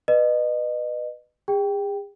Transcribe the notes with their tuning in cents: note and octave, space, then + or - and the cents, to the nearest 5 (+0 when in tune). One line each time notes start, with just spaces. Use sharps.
B4 +0 D#5 -30
G#4 -40 G5 +0